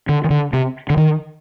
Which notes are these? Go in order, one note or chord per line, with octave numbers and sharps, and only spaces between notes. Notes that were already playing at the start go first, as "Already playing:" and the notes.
D3
D#3
D3
C3
D3
D#3